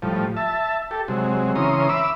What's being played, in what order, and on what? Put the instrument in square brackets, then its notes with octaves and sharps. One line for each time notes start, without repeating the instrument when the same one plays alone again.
[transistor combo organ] A2 F3 G3
E5 A5
G4 A4
C3 F#3 G#3
C#3 E3 C#4 A#5 C6 D#6
E5 B5 D6 E6